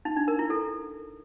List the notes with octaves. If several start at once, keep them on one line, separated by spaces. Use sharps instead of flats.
D#4
D4
A#4
E4
A4